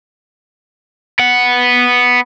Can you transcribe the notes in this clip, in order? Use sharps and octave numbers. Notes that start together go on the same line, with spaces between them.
B3 F#5